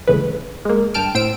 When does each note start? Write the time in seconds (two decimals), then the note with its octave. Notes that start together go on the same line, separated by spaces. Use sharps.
0.07 G#1 A2 C#3 E3 B4
0.65 G#3 A#3
0.94 G2 G5 A5 F6 D7
1.14 A2 C5 E6 D7